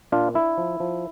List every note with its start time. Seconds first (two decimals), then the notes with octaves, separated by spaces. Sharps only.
0.12 A#2 D4 F4
0.34 D4 E4
0.58 F3
0.80 F3